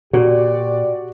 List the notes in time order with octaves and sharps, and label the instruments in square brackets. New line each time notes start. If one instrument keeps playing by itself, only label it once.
[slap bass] A#2 [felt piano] F#4 [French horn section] G4 D5